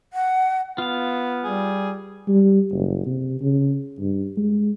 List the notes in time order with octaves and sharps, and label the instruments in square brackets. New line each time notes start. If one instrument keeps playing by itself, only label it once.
[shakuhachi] F#5
[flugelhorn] B3 [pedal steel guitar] F4 F5
[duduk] G3 [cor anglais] G#4
[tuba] G3
F#1
C3
C#3
G2
G#3